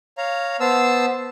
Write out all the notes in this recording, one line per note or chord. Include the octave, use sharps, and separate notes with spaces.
C#5 F5 A#5
B3 C5 A5 E6